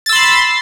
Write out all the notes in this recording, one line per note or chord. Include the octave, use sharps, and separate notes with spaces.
B5 C6 E6 A6